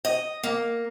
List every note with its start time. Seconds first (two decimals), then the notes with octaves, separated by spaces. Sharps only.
0.05 D#5
0.43 A#3